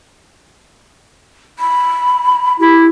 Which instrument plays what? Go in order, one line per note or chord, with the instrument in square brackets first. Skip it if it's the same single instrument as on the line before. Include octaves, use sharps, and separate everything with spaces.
[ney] B5
[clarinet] E4 [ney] G4